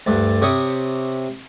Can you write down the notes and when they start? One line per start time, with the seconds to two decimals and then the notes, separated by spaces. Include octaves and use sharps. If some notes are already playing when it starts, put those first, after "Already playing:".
0.07 D2 G2
0.42 C3 G4 C#5 C#6 D#6